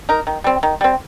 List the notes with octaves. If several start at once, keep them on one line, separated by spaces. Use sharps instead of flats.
D#4 A#4
D#3
G3 C4
D#3
G3 C4